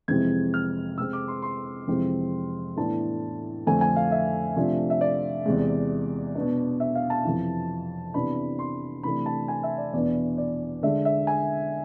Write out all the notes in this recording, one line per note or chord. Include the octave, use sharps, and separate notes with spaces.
F2 C3 E3 G#3 C4 G#6
F6
C3 G#3 C4 E6
D6
C6
C6
F2 C3 E3 G#3 C4
A2 E3 B3 D4 A5
F2 D3 A3 C4 G#5
G#5
F5
E5
C3 F3 A3 D4
E5
D5
E2 C3 G#3
B2 B3 D4
E5
F5
A5
F2 C3 E3
C3 E3 B3 D4 B5
C6
C3 E3 A3 D4 B5
A5
G#5
E5
D5
E2 B2 B3 D4 D5
D5
D3 G#3 D4 E5
E5
G#5